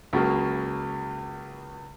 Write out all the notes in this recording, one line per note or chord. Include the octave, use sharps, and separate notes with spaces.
C#2 C#3 F#3 A#3